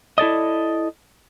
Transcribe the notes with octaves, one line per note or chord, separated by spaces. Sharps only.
E4 A4 D5 D#5